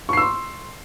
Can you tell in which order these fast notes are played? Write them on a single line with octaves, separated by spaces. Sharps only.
C#6 C7 E6 C6